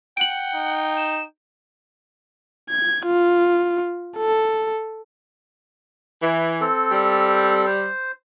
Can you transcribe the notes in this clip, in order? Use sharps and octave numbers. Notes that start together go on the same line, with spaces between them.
F#5 G5 D7 F#7
D#4
E7
G#6
F4
A4
E3
C4 A4
G3
C5